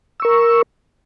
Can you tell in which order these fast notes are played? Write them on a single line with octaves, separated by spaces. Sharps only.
E6 C#6 A#4